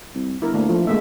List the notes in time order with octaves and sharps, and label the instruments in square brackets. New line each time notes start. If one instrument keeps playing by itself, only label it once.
[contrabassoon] C2
[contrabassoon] G1 [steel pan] E4 A#4
[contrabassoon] D2 [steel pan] A#3 D4
[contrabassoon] F3 [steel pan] A3
[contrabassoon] D2 [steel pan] G#3 A#3 E5